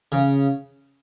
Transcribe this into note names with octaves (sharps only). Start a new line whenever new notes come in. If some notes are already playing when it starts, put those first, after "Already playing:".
C#3